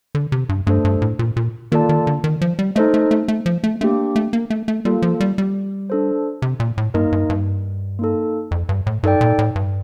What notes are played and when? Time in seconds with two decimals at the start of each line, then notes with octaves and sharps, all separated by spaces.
0.15 D3
0.32 C3
0.49 G2
0.67 G2 A3 D4 A4 C5
0.85 G2
1.02 A2
1.19 A#2
1.36 A#2
1.72 D#3 A#3 F4 A4 D5 A5
1.89 D#3
2.07 D3
2.24 D#3
2.41 F3
2.59 G3
2.76 A3 D#4 A4 C5 D#5
2.94 A3
3.11 A3
3.28 A3
3.46 F3
3.64 A3
3.81 A3 A#3 D4 G4
4.16 A3
4.33 A#3
4.50 A3
4.68 A3
4.85 G3 A#3 F4 A4
5.02 F3
5.20 G3
5.38 G3
5.90 D4 A4 C5
6.42 C3
6.60 A#2
6.78 A2
6.94 G2 A#3 D#4 A#4 D#5
7.12 G2
7.30 G2
7.99 A#3 D#4 A4
8.51 F2
8.69 G2
8.87 A2
9.03 G2 D#4 A4 D5 G5
9.21 A#2
9.39 A2
9.56 G2